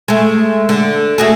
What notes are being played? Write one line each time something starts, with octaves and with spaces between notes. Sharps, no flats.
G#3 A3
D3
A3 F#4 G#4